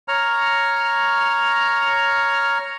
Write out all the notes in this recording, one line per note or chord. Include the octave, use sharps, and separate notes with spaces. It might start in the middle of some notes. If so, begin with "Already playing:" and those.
C#5 A#5 F6